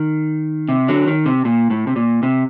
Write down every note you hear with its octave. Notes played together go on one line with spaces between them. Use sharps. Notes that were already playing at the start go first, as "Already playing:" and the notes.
Already playing: D#3
C3
D3 F#3
D#3
C3
A#2
A2
C3
A#2
C3